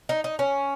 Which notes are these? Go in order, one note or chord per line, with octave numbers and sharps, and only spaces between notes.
D#4
D#4
C#4